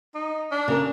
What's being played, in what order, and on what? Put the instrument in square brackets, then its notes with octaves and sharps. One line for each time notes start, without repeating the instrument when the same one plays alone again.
[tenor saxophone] D#4
D4
[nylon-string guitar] C#3 A#4 D5